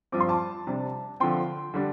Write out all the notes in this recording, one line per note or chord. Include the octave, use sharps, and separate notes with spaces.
G2 F3 C4 D6
C6
A5 D6
C3 G3 D4
D3 F3 C4 G5 C6
D3 G3 D4